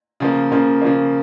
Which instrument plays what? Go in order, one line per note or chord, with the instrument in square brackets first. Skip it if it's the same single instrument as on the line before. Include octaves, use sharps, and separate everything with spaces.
[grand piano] C#3 F3 A#3
C#3 F3 A#3
C#3 F3 A#3